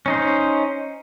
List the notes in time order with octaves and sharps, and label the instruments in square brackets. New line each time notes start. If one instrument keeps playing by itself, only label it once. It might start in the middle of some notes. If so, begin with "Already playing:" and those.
[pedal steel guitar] C#4 D#4 C5